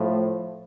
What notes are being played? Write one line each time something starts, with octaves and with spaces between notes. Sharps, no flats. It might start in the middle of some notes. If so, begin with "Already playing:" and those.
Already playing: A2 F3